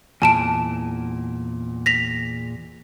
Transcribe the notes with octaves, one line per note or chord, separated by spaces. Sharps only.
E2 A#2 G#5 A5 D7
A#6 B6 F7